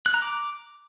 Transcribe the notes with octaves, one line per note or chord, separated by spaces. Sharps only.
F#6
A#5
D6